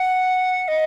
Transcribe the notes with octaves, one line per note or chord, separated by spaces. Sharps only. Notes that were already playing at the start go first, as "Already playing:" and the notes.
Already playing: F#5
D#5